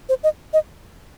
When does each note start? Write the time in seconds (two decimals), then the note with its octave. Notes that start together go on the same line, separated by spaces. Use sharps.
0.09 C5
0.23 D#5
0.53 D#5